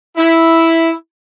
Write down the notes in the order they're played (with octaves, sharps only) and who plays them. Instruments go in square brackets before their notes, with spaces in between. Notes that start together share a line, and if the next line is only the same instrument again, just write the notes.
[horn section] E4